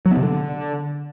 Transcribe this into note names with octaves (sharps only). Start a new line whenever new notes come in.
F#3
B3
C3
D3